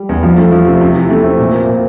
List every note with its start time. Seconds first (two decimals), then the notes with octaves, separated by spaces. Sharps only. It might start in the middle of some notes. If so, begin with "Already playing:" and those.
Already playing: G3
0.09 E2
0.23 F3
0.37 A3
0.52 F3
0.67 C3
0.81 C3
0.96 E3
1.10 A3
1.24 C4
1.38 A#2
1.53 A#3
1.67 A#2